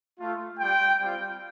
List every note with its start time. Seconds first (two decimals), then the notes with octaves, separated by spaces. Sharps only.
0.19 A3 F4
0.59 G3 F4 G5
1.00 G3 C4 F4